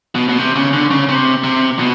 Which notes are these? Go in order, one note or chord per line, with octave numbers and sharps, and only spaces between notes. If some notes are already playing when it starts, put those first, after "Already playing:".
B2
B2
C3
C#3
D3
C#3
C3
C3
B2